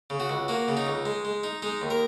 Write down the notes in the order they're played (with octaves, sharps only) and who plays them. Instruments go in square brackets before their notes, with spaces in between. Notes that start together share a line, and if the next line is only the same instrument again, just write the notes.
[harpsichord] C#3
F#4
C#2
A#3 F#4
C#3
D#4
C#2
G#3
G#3
D#4
G#3 D#4
D#2
A#4